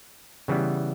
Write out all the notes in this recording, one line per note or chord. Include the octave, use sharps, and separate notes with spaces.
C#3 E3 G3 B3